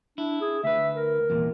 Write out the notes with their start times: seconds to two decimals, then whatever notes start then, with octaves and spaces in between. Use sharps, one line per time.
0.18 D4 E4
0.41 G#4
0.64 D2 B4 E5
0.96 A#4
1.30 E2 A#2